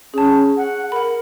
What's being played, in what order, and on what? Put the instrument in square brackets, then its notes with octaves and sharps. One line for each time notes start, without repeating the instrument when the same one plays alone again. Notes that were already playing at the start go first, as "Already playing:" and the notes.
[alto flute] C#4 [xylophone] G#4 A5
[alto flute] F#5
[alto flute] A#4 [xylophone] F#5 B5